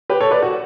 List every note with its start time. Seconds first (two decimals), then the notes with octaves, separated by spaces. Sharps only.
0.09 G4 B4
0.20 A4 C#5
0.31 B4 D5
0.42 F#4